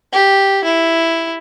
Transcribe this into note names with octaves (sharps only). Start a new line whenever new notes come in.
G4
E4